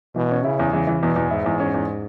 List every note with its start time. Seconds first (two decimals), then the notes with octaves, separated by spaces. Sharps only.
0.16 B2 E3
0.31 C#4
0.44 C#3 E4
0.59 E2
0.73 C#3 E3
0.87 E3
1.02 E2 B2
1.16 E2
1.31 G#2 E4
1.46 E2
1.60 C#4
1.74 E2